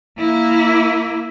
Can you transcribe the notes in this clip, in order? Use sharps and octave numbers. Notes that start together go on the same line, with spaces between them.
A#3 E4